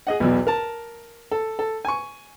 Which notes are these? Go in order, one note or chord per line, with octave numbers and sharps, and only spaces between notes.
G#4 D#5 F#5
B1 E2 B2
A#4 A5
A4
A4
G#5 C#6